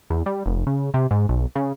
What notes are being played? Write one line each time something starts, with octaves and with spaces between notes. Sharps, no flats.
E2
G3
F1
C#3
C3
G#2
B1
C#3